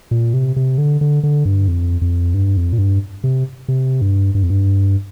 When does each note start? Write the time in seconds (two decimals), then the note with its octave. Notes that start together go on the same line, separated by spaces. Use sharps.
0.11 A#2
0.34 C3
0.56 C3
0.78 D3
1.01 D3
1.23 D3
1.45 G2
1.68 F2
2.01 F2
2.34 G2
2.57 F2
2.73 A#2
2.78 G2
3.24 C3
3.68 C3
4.02 G2
4.35 G2
4.43 F2
4.50 G2